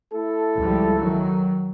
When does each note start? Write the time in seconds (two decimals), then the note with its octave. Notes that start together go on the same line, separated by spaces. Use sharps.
0.13 A3 E4 A4
0.58 C#2 F3 G3
0.96 D#3 F#3